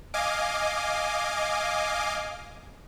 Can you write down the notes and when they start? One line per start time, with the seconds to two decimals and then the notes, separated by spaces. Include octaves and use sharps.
0.14 D#5 F5 G#5 D6